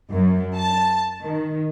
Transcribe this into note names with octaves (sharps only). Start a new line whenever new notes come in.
F#2
A5
D#3